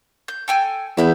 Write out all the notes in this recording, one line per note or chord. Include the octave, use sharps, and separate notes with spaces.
G6
A4 G5 G#5
E2 E4 B5 G6